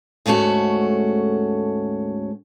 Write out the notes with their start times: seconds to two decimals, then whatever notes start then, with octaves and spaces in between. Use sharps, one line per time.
0.26 D2 G#2 A3 C#4 F#4